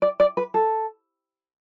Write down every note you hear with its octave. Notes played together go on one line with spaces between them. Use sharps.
D5
D5
B4
A4